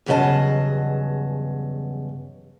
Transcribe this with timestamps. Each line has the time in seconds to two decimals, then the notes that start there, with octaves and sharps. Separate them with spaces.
0.06 E2 G2 C#3 F#3 D#5 A5